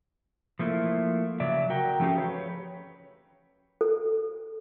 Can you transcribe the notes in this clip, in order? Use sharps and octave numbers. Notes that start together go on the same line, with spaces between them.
F3 A3 A#3 E4
C#3 F#3 D5 E5
F#4 A#4 G5
F3 A3 C#4 G4 G#4
B4 C#5
A4